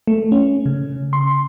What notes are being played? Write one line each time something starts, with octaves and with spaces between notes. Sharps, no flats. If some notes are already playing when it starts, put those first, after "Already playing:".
A3
C#4
C#3
C6